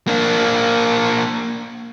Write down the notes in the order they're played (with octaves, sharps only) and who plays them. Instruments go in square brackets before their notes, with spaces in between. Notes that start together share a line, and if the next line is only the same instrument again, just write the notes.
[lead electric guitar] A#3 D4